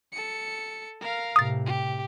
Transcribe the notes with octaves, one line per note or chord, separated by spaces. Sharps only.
A4 C#7
A#4 F5
A2 C3 D#6 A6
G4